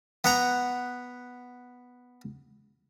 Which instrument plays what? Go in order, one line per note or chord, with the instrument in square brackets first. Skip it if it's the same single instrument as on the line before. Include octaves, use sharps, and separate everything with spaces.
[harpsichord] B3 F#5 A#5